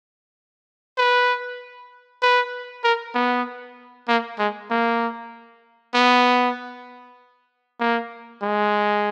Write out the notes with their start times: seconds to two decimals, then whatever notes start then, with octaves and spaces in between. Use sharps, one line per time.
0.98 B4
2.22 B4
2.84 A#4
3.14 B3
4.08 A#3
4.39 G#3
4.70 A#3
5.94 B3
7.80 A#3
8.42 G#3